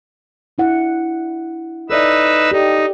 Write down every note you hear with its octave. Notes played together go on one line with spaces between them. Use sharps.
D4 E4 F#5
D#4 A4 B4 D5 E5 E6
D#4 G4 A4 D5